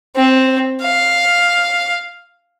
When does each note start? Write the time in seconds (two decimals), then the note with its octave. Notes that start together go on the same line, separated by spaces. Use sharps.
0.16 C4
0.83 F5